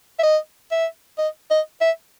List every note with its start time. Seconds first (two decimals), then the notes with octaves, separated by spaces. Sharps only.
0.19 E5
0.23 D#5
0.72 E5
1.18 D#5
1.51 D#5
1.81 E5